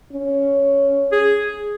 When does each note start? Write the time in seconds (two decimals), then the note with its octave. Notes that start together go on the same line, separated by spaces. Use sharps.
0.13 C#4
1.12 G#4